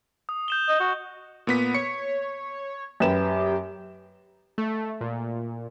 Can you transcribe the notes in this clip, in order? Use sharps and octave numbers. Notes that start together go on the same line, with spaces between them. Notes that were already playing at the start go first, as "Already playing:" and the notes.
D#6
G6 E7 G7
D#5
F#4
A#2 B3 B6
C#5 C#7
F#2 G4 B4 E7
A3
A#2